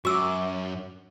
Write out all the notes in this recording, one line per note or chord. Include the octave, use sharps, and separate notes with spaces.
F#2 F#4 C#6 D6 E6